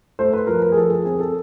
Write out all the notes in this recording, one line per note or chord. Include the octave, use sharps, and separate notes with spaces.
A3 C5
B4
F3 A#4
A#4
G#4
F3 A4
G#4
C4 G#4
A#4
A4